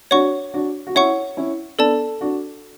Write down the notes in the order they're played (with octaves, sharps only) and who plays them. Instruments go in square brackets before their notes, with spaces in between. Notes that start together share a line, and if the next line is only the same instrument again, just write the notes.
[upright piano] D4 F#4 [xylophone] C#5 F#5 C#6
[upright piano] D4 F#4
F#4
[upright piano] C#4 E4 [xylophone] C#5 F#5 C#6
[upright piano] C#4 E4
[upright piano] B3 D4 [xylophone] A4 D5 A5
[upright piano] D4 F#4